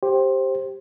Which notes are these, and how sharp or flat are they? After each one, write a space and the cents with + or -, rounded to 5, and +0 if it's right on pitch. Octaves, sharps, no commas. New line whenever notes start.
G4 +0 C5 +15